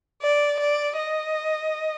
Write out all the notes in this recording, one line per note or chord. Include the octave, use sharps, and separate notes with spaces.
D5
D5
D#5